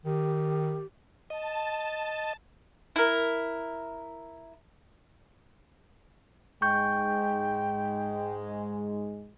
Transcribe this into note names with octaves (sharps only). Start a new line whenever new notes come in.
D#3 G4
D#5 A5
E4 A#4
G#2 G#3 G5 C#6 G6